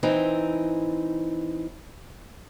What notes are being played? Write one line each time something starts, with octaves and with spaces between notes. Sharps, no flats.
E3 C4 D#4